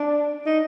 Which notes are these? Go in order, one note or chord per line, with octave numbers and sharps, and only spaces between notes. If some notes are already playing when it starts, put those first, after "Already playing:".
Already playing: D4
D#4